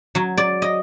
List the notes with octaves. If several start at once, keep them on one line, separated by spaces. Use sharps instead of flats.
F#3
D5
D#5